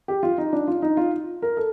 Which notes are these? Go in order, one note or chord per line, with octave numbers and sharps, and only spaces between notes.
G4
F4
D#4
D4
F4
D#4
F4
A#4
A4